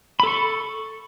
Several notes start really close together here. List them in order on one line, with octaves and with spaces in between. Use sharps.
B5 A4 C#6